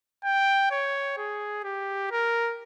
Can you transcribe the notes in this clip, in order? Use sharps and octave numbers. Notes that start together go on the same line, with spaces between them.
G5
C#5
G#4
G4
A#4